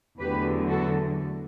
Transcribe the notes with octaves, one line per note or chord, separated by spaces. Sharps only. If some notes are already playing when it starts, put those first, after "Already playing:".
E2 D3 F#3 A3 G4 B4
F#4 A4